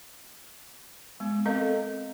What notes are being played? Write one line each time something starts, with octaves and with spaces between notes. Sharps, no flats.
G#3 B3
C4 A4 A#4 D#5 F5